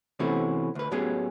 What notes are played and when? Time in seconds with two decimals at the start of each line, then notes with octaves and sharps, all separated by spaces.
0.19 C3 E3 A3 B3 C#4 F#4
0.75 D2 B4
0.91 A2 F#3 B3 C#4 G4 G#4